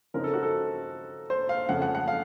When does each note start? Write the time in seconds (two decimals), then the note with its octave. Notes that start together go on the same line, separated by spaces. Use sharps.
0.14 C#3 F3 C4 D#4 A#4
0.24 A4
0.34 F#4
0.43 A4
1.30 C5
1.49 F5
1.68 F2 C#3 A3 F#5
1.82 F#5
1.95 F#5
2.08 F5